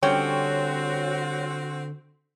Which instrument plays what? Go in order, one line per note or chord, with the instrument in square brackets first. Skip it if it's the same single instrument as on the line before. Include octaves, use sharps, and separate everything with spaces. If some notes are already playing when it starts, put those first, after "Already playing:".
[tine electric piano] D3 [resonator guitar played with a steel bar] G3 C#4 G5 [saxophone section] C4 F#4 [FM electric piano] C#5